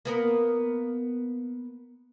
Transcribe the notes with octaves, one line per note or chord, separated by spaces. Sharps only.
A#3 B3 A#4